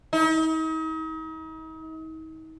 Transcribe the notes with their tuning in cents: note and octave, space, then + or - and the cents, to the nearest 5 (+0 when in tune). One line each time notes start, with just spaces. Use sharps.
D#4 +40